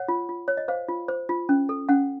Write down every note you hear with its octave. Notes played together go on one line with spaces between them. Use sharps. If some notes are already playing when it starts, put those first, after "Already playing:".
Already playing: C#5 F#5
F4
F4
C#5
D#5
C5 F5
F4
C5
F4
C#4
A4
C#4 F#5